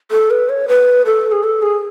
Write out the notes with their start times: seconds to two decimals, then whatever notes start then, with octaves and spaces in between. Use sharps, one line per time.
0.11 A4
0.31 B4
0.49 C#5
0.68 B4
1.06 A4
1.32 G#4
1.43 A4
1.62 G#4